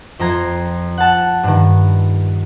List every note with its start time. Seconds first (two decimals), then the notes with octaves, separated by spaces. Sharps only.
0.19 F2 F4 A#5 G#6
0.97 F#5 A5
1.43 G2 D#3